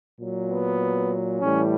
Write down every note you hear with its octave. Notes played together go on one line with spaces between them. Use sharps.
A#2 F#3
B3
A2 E3 G3 C#4